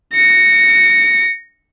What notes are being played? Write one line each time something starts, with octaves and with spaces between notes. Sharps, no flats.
A#6 C#7